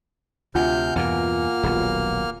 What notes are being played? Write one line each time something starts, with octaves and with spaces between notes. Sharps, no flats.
D2 C3 F4 F#5 G#5 F6 G6
E2 G2 B2 A#3 F6
D#1 B1 F#3